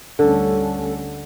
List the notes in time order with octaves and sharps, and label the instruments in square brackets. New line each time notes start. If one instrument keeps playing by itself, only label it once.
[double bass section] D2 G3 C#4 [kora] D3 [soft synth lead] A4